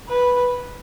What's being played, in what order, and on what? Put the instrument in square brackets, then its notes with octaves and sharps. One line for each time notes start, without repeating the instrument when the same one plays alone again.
[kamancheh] B4